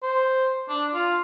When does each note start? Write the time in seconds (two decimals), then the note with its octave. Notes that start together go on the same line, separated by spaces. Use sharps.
0.02 C5
0.69 D4
0.94 F4